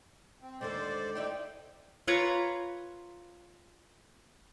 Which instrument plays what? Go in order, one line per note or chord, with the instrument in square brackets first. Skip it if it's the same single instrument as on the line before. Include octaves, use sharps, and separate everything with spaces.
[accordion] C4
[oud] D#2 D3 G#3 [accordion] C5 D5
[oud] D#4 E4 D5 [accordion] G5
[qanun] F4 B4 C#5 A#5